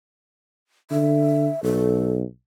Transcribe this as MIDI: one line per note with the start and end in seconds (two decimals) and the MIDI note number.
0.91 1.48 50
0.91 1.63 76
1.63 2.23 35
1.63 2.13 69